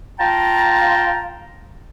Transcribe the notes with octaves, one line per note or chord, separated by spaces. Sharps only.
F4 G5 A5 A#5